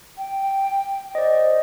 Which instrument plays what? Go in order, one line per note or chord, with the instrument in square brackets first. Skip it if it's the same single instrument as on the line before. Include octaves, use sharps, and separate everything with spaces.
[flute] G5
[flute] C5 [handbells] D5 D#5